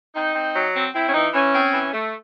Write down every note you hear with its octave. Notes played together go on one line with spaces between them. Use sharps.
C4 D#4
C4
F#3
C4
C4 E4
C#4
E3 D#4
E3 C#4
C4
E3
A3